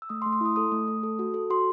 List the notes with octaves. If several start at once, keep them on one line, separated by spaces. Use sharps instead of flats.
E6
A3 D#6
C6
A3
C6
E4 D#6
A4 D#6
A3
A3
A4
F#4
A4
F#4 C6